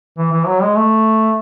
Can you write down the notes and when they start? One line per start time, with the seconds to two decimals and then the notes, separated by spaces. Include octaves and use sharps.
0.18 E3
0.32 E3
0.47 F#3
0.62 G#3
0.76 A3